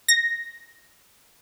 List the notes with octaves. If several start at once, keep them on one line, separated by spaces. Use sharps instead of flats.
A#6